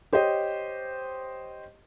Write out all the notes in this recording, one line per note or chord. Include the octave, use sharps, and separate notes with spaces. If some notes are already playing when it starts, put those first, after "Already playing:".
G4 C5 C#5 D#5